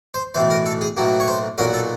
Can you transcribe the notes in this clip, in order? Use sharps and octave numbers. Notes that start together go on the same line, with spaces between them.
C5
B1 A2 E3 C5
A#4
A4
G#4
B1 A2 F#3 A#3
C#5
C5
B1 A#2 F#3 A#4
A4